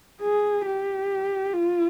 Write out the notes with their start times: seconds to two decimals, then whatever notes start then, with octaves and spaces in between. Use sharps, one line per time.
0.22 G#4
0.66 G4
1.53 F4